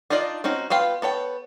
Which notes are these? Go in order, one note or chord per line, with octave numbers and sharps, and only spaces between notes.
D4 D#4 F4 D5 D#5
C4 C#4 D#4 F#4
B3 F4 F5 G5
B3 A4 C#5 G5